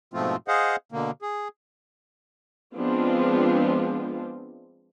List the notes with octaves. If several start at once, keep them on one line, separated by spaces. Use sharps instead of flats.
G#2 B2 F3 A3 C4 F4
G#4 C5 D#5 F5 F#5
B2 D3 A#3
G#4
F3 G#3 B3 C4 D4 F4